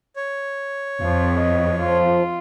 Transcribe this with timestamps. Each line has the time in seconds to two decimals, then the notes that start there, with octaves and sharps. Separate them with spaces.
0.16 C#5
1.02 F2 F3
1.39 D#5
1.79 F3 F4